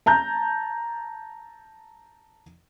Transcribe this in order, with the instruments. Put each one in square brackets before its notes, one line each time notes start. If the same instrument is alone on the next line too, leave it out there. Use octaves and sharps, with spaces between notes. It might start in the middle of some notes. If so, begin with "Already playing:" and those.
[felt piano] A5 A#5 G6